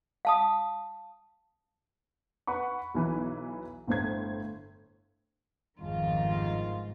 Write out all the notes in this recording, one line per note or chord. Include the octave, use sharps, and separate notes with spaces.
F5 A5 D#6
B4 F#5 B5 C#6
B1 E3 B4
G1 A2 C5 G#6
G1 F2 G#2 D#3 F4